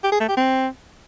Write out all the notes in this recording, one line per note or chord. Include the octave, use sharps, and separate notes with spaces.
G4
G#4
A3
G4
C4